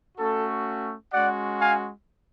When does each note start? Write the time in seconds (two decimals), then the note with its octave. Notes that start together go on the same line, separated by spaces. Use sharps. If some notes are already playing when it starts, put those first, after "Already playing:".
0.18 A3 C#4 F#4 A4
1.13 G#3 C#4 F#4 D5 F#5
1.60 F5 G#5